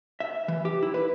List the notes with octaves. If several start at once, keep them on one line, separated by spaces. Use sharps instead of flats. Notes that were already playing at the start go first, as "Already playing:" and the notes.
E5
E3
G4
E4
B4